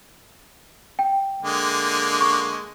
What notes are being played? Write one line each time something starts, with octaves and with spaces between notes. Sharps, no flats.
G5
D3 G#3 A#3
C#6